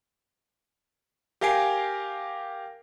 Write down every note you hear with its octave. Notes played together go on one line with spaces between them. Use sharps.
G4 A#4 F5 G#5 C7 D7